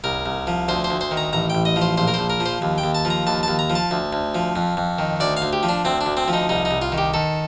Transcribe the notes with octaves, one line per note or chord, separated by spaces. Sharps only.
C2 A#4
C2
F3
D2 C5
C5
D2
C5
D#3
A#5
A1 A#5
A1 G5
D#5
F3
C5
A#1 C5
A#4
A#1 C5
A#4
F3
C5
D#2
G5
D#2
A5
F3
A#5
D#2 A5
A5
D#2
A#5
F3
A5
D2
D2
F3
F2
F2
D#3
D2 D5
F5
D2
G4
F3
D4
D2 C4
D4
D2
C4
F3
D#4
C2 D#4
D#4
C2
F4
D#3
G4
D#3 A4